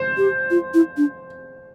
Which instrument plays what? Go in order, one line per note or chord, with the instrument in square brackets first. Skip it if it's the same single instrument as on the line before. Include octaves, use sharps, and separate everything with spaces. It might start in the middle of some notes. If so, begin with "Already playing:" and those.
Already playing: [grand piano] C5
[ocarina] G4
F4
E4
D4